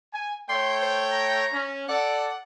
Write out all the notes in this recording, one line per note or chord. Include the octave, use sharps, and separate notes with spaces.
G#5
A3 C#5 G5 C6
C5
A#5
C#4
A4 D5 F#5